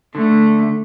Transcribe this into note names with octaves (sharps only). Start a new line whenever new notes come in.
D3 A3